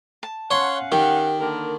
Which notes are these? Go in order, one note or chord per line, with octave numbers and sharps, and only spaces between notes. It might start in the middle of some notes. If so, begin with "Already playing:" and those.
A5
C#4 C#5 F5 F#5 C6
D#3 G4
D3 A#3 A#4